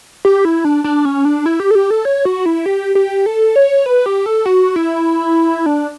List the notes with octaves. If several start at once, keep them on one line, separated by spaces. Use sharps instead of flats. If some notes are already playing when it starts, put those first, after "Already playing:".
G4
E4
D4
D4
C#4
D4
E4
G4
A4
G4
A4
C#5
F#4
E4
G4
G4
A4
C#5
B4
G4
A4
F#4
E4
D4